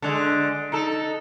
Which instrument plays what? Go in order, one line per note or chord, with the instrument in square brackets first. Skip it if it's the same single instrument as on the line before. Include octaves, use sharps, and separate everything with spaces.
[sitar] D3 G#3
D#4 A4